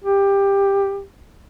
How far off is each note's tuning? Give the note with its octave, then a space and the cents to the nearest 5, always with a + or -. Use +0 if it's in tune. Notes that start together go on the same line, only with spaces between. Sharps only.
G4 +15